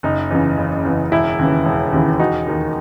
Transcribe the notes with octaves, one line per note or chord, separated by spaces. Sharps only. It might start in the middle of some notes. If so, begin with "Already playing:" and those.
F#1 D#4
E2 C#3
F#1
E2 C#3
E1 E4
D#2 C#3 E3
E1
D#2 C#3 E3
E1 D#4 F#4
D#2 D#3